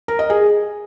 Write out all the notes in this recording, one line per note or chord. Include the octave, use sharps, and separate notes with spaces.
A#4
D#5
G#4